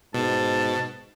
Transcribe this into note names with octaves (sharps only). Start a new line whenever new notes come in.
G#2 B2 A5